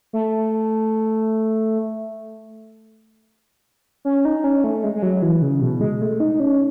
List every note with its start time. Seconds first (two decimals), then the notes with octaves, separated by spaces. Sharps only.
0.13 A3
4.05 C#4
4.25 D#4
4.44 C#4
4.64 A3
4.84 G#3
4.95 G#3
5.03 F#3
5.22 E3
5.42 C#3
5.61 B2
5.81 G#3
6.01 A3
6.20 D#4
6.40 C#4